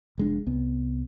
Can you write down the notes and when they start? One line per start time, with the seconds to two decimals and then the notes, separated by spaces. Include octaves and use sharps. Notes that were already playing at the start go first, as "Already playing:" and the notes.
0.18 F1 G#3 D4
0.46 C2 B3